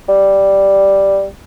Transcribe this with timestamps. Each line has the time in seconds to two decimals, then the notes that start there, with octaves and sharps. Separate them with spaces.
0.08 G3